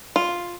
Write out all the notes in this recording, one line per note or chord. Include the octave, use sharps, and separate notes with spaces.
F4